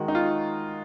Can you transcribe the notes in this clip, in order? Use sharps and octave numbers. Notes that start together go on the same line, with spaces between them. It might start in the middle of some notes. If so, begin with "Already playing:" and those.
Already playing: D#3 G#3 F#4
D#4
F4